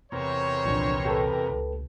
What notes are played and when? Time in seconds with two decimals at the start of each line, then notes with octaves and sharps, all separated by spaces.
0.12 E2 C3 A#4 C5 C#5
0.65 C2 A#2 E3 F3 D4
1.05 G4 A4 B4
1.50 C#2